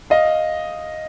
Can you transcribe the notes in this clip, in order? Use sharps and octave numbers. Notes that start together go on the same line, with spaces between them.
D#5 F5